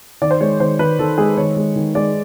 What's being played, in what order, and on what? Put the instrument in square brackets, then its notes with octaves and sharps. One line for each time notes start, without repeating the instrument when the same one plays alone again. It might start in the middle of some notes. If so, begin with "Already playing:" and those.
[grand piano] D#3 [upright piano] D5
[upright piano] C5
[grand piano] G#3 [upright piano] C#5
[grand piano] D#3 [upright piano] C5
[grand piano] D#3 [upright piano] B4
[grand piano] D#3 [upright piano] A4
[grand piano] G#3 [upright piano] G#4
[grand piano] D#3 [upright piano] C#5
[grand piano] G#3
D#3
[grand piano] G#3 [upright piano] D5